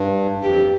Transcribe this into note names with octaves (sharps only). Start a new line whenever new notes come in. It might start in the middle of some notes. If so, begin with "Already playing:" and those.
Already playing: G2
F2 G4